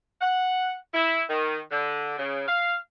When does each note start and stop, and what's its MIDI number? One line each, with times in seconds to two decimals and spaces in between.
0.21 0.75 78
0.94 1.23 64
1.30 1.59 51
1.72 2.18 50
2.18 2.47 49
2.48 2.75 77